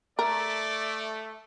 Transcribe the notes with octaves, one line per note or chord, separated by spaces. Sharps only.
A3 A#4 D5